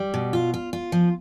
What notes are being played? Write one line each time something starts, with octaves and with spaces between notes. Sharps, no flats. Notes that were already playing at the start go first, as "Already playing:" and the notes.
Already playing: G3
B2
F4
F4
F4
F3